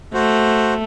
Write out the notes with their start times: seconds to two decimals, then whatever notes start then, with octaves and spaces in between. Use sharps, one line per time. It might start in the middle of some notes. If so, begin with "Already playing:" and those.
0.14 A3 F#4 C5